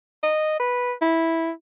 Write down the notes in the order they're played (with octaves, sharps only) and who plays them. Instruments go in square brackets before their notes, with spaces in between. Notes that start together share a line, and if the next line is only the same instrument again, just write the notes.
[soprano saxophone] D#5
B4
E4